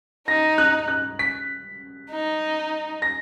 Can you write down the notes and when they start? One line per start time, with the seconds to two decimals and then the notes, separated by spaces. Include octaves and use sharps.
0.28 D#4 A#6
0.58 F#6
0.88 F#6
1.19 B6
2.11 D#4
3.02 A#6